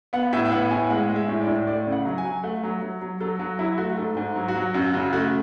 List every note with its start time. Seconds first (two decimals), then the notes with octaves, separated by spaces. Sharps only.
0.13 B3 F#5
0.33 A2 E5
0.46 E5
0.51 B3 F#5
0.71 A2 G#5
0.90 G#3 F#5
1.10 G#3
1.16 E5
1.28 A2
1.42 D5
1.47 A2
1.67 A3 D5
1.87 C#3
1.92 F#5
2.05 F#3
2.18 G#5
2.25 F#3
2.43 A3 F#5
2.63 F#3
2.82 F#3
3.02 F#3
3.20 F#3 A4
3.39 F#3 F#4
3.59 F#3 E4
3.78 A3 F#4
3.97 G#2 A4
4.17 G#2
4.36 F#3
4.48 F#4
4.55 F#3
4.74 F#2 F#4
4.93 C#3 F#4
5.13 A3 F#4